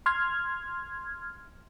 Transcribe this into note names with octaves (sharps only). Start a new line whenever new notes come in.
C6 F6 G#6